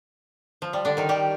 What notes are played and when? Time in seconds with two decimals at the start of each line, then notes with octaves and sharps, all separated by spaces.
0.62 F3
0.73 G3
0.85 D3 D4
0.97 D#3 D#4
1.09 G3 G4